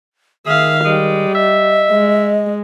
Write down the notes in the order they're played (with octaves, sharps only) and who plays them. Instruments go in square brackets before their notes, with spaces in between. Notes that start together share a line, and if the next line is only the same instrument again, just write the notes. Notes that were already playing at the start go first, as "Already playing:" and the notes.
[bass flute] D#3 [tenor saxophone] G#4 [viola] E5 F5
[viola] G3 [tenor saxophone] G#3
[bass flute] D#5 [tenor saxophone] E5
[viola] G#3